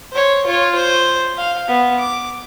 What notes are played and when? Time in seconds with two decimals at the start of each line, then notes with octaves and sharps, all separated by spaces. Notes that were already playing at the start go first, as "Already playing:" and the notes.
0.13 C5 C#5
0.46 F4 C#5
0.75 C5
1.37 F5
1.68 B3
1.99 D6